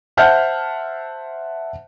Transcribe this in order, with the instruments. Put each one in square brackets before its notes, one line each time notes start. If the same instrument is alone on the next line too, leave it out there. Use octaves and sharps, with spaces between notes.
[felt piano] C5 E5 F#5 A5 F6 G6